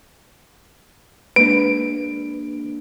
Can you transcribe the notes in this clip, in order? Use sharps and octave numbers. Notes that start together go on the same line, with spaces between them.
G#3 A#3 D4 B4 D7